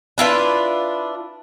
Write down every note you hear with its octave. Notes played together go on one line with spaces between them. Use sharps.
D4 E4 F4 B4